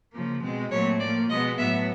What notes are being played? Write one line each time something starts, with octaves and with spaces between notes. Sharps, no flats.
C#3 F3 A#3
B2 G#3 C4
A#2 F#3 A3 C4 C#5
A2 F3 A#3 D5
B2 G#3 B3 D#5
A2 F#3 B3 E5